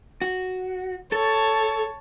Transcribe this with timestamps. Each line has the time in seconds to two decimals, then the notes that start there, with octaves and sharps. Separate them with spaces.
0.21 F#4
1.12 A4 C#5 A5